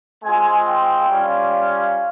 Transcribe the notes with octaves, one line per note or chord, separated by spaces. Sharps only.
G#3 C4 F4 G#5
G5
G3 C#4 F4
F5